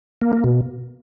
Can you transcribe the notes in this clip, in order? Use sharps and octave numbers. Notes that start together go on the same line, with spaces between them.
A#3
A#3
B2